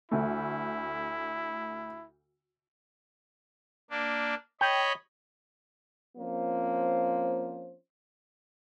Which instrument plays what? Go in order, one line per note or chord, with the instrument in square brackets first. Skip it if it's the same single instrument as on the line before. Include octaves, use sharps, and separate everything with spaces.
[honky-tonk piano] D2 A3 [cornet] E4
[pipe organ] A#3 D4
[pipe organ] C#5 D#5 B5 [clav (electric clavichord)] G5
[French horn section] F3 A#3 C4 C#4 C5